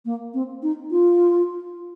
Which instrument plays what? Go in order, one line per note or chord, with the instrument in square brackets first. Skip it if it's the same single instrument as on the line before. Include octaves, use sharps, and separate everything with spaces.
[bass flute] A#3
C4
D#4
F4